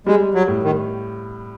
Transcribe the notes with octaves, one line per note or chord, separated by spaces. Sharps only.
G3 G#3
F#3
A2
D#3